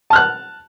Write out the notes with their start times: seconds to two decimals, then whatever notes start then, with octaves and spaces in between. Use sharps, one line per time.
0.10 A5
0.13 F6
0.15 F#6